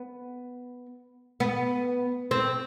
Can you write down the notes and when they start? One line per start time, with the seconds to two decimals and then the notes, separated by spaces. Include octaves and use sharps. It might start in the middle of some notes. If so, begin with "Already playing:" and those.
Already playing: B3
1.40 B3
2.31 C4